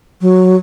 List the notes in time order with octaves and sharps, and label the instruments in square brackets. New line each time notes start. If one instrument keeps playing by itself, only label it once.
[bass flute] F#3